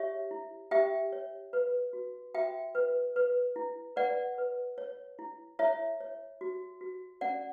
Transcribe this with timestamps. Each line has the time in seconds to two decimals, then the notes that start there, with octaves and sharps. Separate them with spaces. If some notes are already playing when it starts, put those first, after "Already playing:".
Already playing: G4 C#5 E5
0.31 E4
0.71 G4 E5 G5
1.12 C#5
1.53 B4
1.93 F#4
2.34 F#4 E5 G5
2.75 B4
3.16 B4
3.56 E4
3.96 B4 D5 F#5
4.38 B4
4.78 C#5
5.19 E4
5.59 E4 C#5 E5
6.01 C#5
6.41 F#4
6.81 F#4
7.21 C#4 D5 F#5